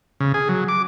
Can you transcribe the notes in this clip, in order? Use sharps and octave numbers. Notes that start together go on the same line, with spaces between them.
C#3
G#4
F#3
D6